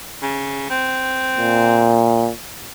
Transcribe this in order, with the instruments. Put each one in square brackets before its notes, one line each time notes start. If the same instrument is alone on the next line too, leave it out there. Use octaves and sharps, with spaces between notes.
[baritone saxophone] C#3
C4
[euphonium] A#2